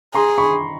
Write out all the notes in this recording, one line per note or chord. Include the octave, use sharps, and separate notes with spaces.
G#4 A#5 C6
B5 C#6